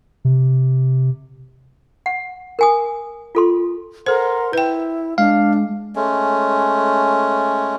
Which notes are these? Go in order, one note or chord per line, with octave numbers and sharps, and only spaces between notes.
C3
F#5
A#4 G#5 D#6
F4 A4 C6
A4 A#4 C5 F#5 C6
E4 B4 G5
G#3 D4 F5
G#3 A3 C#4